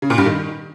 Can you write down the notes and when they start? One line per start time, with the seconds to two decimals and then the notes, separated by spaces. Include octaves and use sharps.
0.02 C#3
0.10 A#2
0.18 G2
0.26 D#3